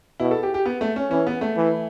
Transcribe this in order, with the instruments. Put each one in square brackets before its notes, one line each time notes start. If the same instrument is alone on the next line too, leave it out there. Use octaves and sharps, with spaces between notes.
[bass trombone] B2 [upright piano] E4
[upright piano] A4
G4
G4
B3
A3
C#4
[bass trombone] E3 [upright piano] C#4
[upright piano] B3
A3
[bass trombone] E3